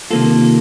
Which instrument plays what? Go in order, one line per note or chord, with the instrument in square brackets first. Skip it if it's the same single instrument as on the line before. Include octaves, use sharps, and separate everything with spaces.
[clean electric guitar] C3 D#3 A#3 F4 A4